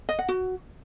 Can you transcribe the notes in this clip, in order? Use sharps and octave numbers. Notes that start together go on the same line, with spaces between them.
D#5
F#5
F#4